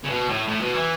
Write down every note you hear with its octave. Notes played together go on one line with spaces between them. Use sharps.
C#3
B2
A2
A2
B2
E3